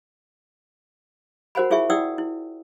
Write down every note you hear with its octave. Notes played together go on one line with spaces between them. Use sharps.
F#4 A#4 C5 F#5 G#5 B5
E4 F4 G#4 E5 G#5 C#6
E4 D5 F#5 G5 D#6 E6
E4